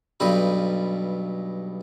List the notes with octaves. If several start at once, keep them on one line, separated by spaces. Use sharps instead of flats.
B1 G2 B4